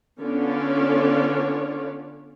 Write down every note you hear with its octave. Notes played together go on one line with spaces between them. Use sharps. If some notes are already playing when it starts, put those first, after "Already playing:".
D3 B3 C#4 F4 C#5 D5